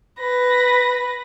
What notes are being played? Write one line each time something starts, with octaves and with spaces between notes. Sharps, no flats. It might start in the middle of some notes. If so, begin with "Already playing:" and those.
B4 A#6